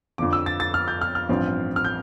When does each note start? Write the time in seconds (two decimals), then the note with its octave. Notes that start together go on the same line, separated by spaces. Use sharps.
0.18 F2 D3 F3 D6
0.33 E6
0.46 A6
0.60 A6
0.74 F6
0.88 G6
1.01 F6
1.15 F6
1.29 A1 G2 F3 C4
1.76 F6
1.84 G6